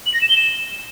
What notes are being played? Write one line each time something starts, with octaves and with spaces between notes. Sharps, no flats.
F#7
A#6
E7
G7
E7